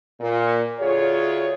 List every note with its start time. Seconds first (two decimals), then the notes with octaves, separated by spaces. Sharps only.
0.20 A#2
0.80 D2 F4 G#4 C#5